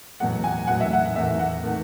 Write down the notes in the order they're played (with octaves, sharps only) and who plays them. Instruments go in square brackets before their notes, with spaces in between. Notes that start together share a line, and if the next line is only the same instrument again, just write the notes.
[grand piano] E2 B2 F#3 A3 F#5
G#5
E2 B2 F#3 A3 F#5
E5
F#5
E2 D#3 A3 E5
F#5
D#3 A3